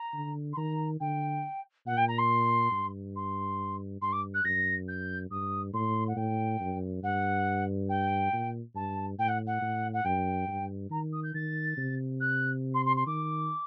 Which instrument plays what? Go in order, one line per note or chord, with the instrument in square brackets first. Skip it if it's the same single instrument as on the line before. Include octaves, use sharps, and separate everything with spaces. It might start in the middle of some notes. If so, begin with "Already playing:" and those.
Already playing: [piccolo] A#5
[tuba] D3
[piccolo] C6
[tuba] D#3 [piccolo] A#5
[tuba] D3 [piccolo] G5
[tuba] A#2 [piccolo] F#5
[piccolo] G5
A#5
C6
[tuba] G2
[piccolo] C6
[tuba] G2 [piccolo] C6
[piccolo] D6
F#6
[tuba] F#2 [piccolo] A#6
[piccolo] G6
[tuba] G2 [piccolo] D#6
[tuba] A2 [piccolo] C6
[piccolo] F#5
[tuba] A2 [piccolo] G5
[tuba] F#2
[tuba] G2 [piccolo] F#5
[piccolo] G5
[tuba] A#2
[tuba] G2 [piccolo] A5
[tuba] A2 [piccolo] G5
[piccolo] F#5
F#5
[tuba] A2
[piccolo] F#5
[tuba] F#2 [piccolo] G5
[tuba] G2
[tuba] D#3 [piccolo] A#5
[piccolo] D#6
G6
[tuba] D#3 [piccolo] A6
[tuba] C3
[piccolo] F#6
C6
C6
C6
[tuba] D#3 [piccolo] D6